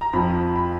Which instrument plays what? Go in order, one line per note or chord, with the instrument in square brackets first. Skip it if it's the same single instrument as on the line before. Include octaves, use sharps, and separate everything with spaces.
[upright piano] A#5
F2 F3 B5
B5